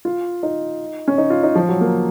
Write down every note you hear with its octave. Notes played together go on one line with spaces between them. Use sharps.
F4
D#4
C#4
D#4
F4
D#4
F3
F#3
A#3